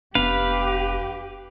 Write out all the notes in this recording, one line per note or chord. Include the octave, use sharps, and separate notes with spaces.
F1 B3 D4 G4 B4 F5